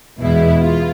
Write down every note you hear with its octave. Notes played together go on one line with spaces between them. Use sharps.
E2 B2 G#3 B3 E4
F4